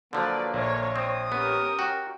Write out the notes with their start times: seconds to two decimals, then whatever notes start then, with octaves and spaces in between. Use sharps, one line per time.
0.13 D3 F3 F#3 A#3 B4 D5
0.53 A#1 C#5 D5
0.96 C4 D#6
1.32 B3 C#4 G4 A#4
1.79 F#4 G5